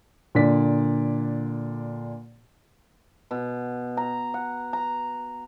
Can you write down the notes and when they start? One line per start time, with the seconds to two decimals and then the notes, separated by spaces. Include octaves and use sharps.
0.35 A#2 D3 D5 B6
3.31 B2
3.97 A#5
4.34 F#5
4.73 A#5